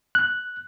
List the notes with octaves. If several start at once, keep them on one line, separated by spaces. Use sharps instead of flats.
F#6